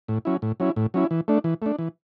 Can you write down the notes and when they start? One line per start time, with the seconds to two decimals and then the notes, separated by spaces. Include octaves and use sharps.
0.08 A2
0.25 F#3 C#4 E4
0.42 A2
0.60 F#3 C#4 E4
0.76 A2
0.94 F#3 C#4 E4
1.11 E3
1.28 A3 D4
1.44 E3
1.62 A3 D4
1.79 E3